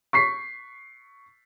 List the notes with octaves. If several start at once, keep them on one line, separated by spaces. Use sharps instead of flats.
C#6 B6 C7